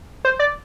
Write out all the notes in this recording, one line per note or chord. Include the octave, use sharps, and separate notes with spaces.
C5
D5